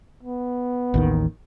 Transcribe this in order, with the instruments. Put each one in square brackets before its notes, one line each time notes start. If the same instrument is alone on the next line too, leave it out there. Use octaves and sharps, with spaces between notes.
[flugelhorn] B3
[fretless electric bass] A1 D#2 D#3